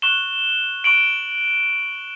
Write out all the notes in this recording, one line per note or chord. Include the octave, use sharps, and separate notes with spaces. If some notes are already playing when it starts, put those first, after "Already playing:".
C#6 F#6 E7 G7
C#6 F#6 D7 F#7